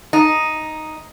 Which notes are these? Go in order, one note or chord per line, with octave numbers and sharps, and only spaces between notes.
D#4